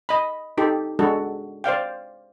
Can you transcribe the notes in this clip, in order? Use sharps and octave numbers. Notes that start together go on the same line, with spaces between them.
D#5 B5
D#4 G4 A4
G#3 D4 F#4 A4
C5 D5 F5 G5